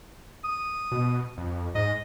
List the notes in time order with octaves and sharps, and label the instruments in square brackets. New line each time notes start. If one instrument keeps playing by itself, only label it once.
[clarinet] D#6
[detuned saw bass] B2
F2
[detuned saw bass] G#2 [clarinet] D#5